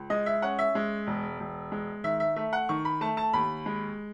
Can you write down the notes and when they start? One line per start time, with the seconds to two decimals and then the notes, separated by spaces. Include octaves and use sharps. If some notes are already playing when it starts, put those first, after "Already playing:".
Already playing: C#2
0.10 G#3 D#5
0.26 E5
0.42 C#4 F#5
0.59 E5
0.75 G#3
1.07 E1
1.40 E1
1.72 G#3
2.04 D#3 E5
2.20 E5
2.36 A3 E5
2.53 F#5
2.69 D#3 C#6
2.85 B5
3.01 A3 A5
3.17 A5
3.33 D#2 B5
3.66 G#3